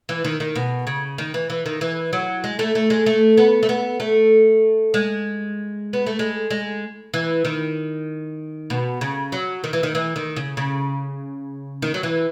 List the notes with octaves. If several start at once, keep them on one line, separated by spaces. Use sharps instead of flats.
E3
D#3
D#3
B2
C#3
D#3
E3
E3
D#3
E3
F#3
G#3
A3
A3
G#3
A3
B3
A3
B3
A3
G#3
B3
A3
G#3
G#3
E3
D#3
B2
C#3
F#3
D#3
E3
D#3
E3
D#3
C#3
C#3
D#3
F#3
E3